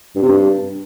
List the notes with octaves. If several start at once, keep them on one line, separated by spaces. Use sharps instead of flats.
G2
C3
G2